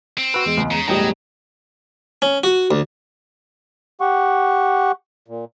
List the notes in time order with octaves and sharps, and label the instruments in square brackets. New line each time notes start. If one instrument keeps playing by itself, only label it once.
[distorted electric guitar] C4
[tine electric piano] F#4 B4 [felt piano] E6
[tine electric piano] E2 G#3
[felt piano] C#2
[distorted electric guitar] C#3 [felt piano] A#5
[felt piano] E1 A2 G3 [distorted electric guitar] F#3 [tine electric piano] D#5 G5 A#5
[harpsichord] C#4
F#4
D2
[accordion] G4 F#5 C#6
A#2